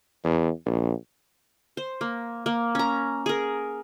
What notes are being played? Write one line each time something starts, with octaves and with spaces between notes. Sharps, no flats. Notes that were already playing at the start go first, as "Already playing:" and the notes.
E2
A#1
C5
A#3
A#3
C#4 A#5
G#4 A#4